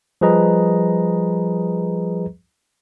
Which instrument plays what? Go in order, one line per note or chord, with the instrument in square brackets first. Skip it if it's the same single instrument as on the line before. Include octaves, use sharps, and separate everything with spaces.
[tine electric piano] F3 G3 G#4 B4 D#5 A#5